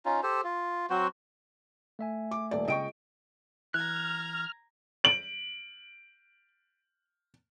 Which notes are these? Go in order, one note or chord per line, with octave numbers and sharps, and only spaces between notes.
C#4 D#4 F4
G4 A4 C5
F4
F#3 C4 F#4 C5
A3 E5 G#5
D6
D#1 D5
C#2 D#5 G5 C#6 D7
E3 A#5 F6 F#6 G#6
D7 F#7